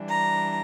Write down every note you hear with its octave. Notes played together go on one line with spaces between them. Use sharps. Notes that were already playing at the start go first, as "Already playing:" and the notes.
Already playing: E3 G3 D4
A#5